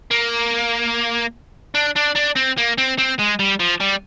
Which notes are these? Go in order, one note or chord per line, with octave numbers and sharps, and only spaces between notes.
A#3
D4
D4
D4
C4
A#3
C4
C4
G#3
G3
F3
G3